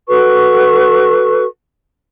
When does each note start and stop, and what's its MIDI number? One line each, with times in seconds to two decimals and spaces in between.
0.08 1.44 66
0.08 1.44 69
0.08 1.44 71
0.08 1.44 85